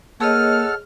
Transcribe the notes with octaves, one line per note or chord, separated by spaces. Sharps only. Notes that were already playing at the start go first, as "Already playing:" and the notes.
A#3 G#4 A4 C#5 D#5 F#5 A5 F6